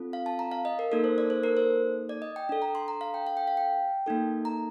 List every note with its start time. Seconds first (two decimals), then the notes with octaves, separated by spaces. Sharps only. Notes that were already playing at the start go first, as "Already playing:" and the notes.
Already playing: C4 F4 A4
0.13 F5
0.26 A5
0.39 A#5
0.52 F5
0.65 D#5
0.79 A#4
0.92 A#3 D#4 A4 A#4
1.04 C5
1.18 D5
1.30 C5
1.43 A#4
1.57 C5
2.09 D5
2.22 D#5
2.36 G5
2.49 D4 A4
2.62 A#5
2.75 C6
2.88 A#5
3.01 F5
3.14 G5
3.27 F5
3.37 G5
3.47 F5
3.57 G5
4.06 A#3 D#4 A4
4.45 A#5